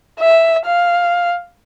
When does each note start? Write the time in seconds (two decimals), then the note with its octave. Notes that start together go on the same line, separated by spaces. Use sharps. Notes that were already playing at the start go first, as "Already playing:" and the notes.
0.19 E5
0.66 F5